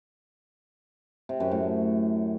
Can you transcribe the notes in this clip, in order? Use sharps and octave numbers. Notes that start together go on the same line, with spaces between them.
C3
F#2
A2